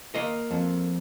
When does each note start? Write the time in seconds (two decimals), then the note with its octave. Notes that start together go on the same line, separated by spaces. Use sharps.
0.15 A#3 D#5
0.51 F2